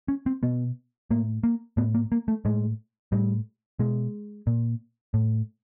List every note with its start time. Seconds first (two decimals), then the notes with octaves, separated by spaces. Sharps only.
0.08 C#4
0.26 C4
0.43 B2 B3
1.11 A2 A#3
1.43 A#3
1.77 A2 B3
1.94 A#3
2.12 A#3
2.28 A3
2.45 A2 G#3
3.12 A2 G3
3.79 B2 G#3
4.47 A#2
5.14 A2